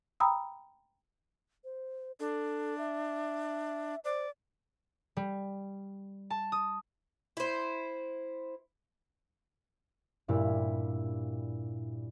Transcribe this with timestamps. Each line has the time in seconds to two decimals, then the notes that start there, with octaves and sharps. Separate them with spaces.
0.20 G5 A#5 B5 D#6 E6
1.64 C5
2.20 D4 A4
2.78 E5
4.05 C5 D5
5.17 G3
6.30 A5
6.52 D#6
7.37 E4 C5
10.28 G2 A#2 G3 E4